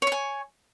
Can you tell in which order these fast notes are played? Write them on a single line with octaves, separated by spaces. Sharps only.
C#5 C#6 G#5